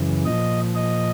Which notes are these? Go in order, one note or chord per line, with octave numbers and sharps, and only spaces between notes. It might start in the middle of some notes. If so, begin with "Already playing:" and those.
Already playing: F#2 C#3 E3
A#2 F3 D#5
D#5